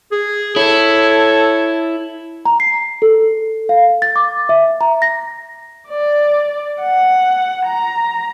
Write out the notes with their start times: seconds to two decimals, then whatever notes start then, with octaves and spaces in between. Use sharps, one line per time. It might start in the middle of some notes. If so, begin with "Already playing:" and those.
0.12 G#4
0.56 E4 A4 C#5
2.45 A#5
2.60 C7
3.02 A4
3.69 F5
4.02 A6
4.16 D6
4.49 E5
4.81 A#5
5.02 A#6
5.88 D5
6.82 F#5
7.66 A#5